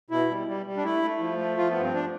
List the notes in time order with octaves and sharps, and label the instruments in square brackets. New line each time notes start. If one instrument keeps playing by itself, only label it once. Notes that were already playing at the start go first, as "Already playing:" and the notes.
[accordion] B2 E4
G3
G3
G3
D4
A3 E4
A3
F3
A3
F3 F4
B3
G2
C4
D4